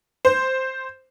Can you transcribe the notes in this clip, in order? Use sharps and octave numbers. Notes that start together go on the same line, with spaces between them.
C5